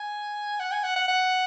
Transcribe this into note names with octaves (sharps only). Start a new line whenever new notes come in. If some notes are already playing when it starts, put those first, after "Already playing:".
Already playing: G#5
F#5
G#5
F#5
F#5
F#5